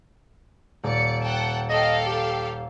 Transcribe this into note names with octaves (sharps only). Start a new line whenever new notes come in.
D#1 D5 C#7
F#5 G5 A5
A4 D#5 F5 G5
G4